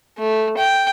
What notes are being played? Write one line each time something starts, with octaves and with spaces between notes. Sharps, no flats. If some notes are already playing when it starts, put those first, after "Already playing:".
A3
G5